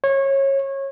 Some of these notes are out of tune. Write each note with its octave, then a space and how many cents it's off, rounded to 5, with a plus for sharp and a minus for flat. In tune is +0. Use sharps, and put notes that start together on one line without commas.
C#5 -25